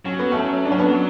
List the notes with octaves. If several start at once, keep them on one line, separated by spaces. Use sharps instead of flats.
F#3 C#4
B3
A3 C#4
D4
C#4
B3 D4